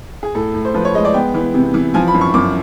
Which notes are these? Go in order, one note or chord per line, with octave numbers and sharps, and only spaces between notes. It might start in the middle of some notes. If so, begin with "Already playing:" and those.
G#4
A2 A4
A2
C5
F3 B4
C#5
G#3 D#5
D5
B3 G5
E3
C3
E3
F3 G#5
B5
F#2
C#6
F#2 D6